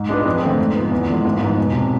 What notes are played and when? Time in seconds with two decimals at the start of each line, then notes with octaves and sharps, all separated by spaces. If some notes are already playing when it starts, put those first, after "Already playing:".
Already playing: G#2
0.09 G#3 D4 F4 B4
0.25 F2
0.42 D3 A3 C4
0.59 G#2
0.75 F3 B3
0.92 E2
1.09 D3 F3 G#3
1.25 G#1
1.41 G#2 F3 B3
1.58 E1
1.75 C3